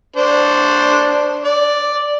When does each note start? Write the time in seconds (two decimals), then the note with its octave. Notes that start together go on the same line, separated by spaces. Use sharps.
0.16 D4 C5
1.45 D5